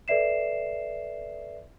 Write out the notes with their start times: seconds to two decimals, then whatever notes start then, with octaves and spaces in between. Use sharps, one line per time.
0.08 A4 B4 D5 E5 C7 E7